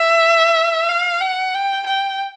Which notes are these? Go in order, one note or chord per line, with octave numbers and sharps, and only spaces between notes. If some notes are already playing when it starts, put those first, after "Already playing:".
Already playing: E5
F5
F#5
G5
G5